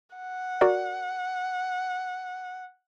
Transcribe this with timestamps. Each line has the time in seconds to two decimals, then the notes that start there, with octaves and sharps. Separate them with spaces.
0.16 F#5
0.61 F#4 A#4 D5